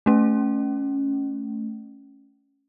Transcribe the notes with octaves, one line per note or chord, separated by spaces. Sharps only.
A3 C#4